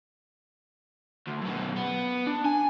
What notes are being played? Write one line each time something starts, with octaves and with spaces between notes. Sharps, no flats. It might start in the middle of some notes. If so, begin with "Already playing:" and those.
D2
F#2 B2
B3
D4
G#5